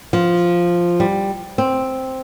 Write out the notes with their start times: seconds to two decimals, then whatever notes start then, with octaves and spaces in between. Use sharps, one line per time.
0.13 F3
1.00 G3
1.58 C4